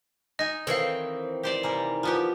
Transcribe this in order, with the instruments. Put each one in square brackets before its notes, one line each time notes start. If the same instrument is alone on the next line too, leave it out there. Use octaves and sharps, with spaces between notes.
[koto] D#4 G#5 [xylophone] D#5
[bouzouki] D#3 E3 C4 [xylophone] A4 F5 [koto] C#5
[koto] G4 C5 D5
[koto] C3 G3 A#3 [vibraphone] G#5 A#5
[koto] F3 B3 G4 [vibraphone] F4